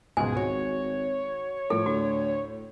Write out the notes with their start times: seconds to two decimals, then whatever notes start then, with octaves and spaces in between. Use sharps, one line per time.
0.17 C#2 G#2 B2 G#4 G#5
0.37 G#1 F#4 C#5
1.70 A2 F3 A4
1.86 D2 F#4